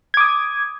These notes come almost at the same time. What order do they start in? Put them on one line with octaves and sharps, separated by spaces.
G#6 D6 D#6